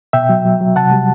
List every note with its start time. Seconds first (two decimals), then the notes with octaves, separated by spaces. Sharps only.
0.13 B2 E5 G5
0.29 F#3
0.45 F#3
0.61 F#3
0.76 C3 F#5 A5
0.92 G3